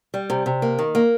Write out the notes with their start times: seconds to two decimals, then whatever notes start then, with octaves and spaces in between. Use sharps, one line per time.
0.14 G3
0.30 C3
0.46 C3
0.62 A#3
0.79 D#3
0.95 A#3